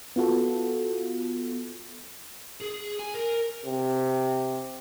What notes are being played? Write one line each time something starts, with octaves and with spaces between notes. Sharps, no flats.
B3 F4 F#4 A4
G#4
G#5
A#4
C3